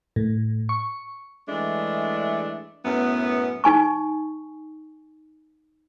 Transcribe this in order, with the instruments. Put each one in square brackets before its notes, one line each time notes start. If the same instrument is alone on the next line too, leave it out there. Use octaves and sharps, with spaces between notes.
[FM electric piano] A2
C#6
[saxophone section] E3 G#3 A3 D4
F#2 A2 B3
[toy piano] D#4 G#5 C#6